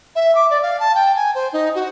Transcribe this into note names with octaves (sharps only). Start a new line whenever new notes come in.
E5
D6
D5
F5
A5
G5
G#5
C5
D#4
F#4